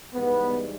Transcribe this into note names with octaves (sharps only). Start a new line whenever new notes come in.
G#2 E3 G3 B3